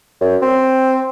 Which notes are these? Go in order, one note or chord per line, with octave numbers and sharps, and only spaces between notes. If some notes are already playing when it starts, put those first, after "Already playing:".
F#2
C4